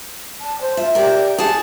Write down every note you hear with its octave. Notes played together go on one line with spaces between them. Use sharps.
A5
C5
F4 E5
G4 A#4 D5
G#4 F#5 A5